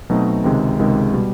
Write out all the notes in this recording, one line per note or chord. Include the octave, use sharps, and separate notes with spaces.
B2 F#3 A3 C4 D#4
C#2 C3 D#3 G#3
C#2 C3 D#3 G#3
B2 G3